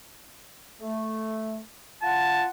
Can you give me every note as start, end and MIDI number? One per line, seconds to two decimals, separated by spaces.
0.81 1.60 57
2.03 2.48 65
2.03 2.48 78
2.03 2.47 81